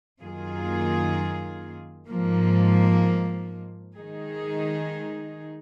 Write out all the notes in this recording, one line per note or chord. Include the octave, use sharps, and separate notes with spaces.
F#2 D#3 A#3 F4 G#4
G#2 F3 A#3
D#3 G#3 D#4 G#4